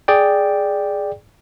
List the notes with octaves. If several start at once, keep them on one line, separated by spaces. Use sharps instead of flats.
G#4 D5 G5